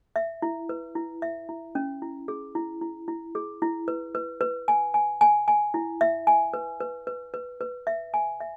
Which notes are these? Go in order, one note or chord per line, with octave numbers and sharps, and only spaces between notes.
E5
E4
B4
E4
E5
E4
C#4
E4
G#4
E4
E4
E4
G#4
E4
B4
B4
B4
G#5
G#5
G#5
G#5
E4
E5
G#5
B4
B4
B4
B4
B4
E5
G#5
E5